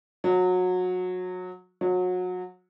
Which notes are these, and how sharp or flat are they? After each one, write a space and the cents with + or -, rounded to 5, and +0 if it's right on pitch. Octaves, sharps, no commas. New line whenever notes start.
F#3 -25
F#3 -30